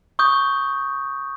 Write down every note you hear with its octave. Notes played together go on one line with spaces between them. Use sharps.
C#6 D#6 G6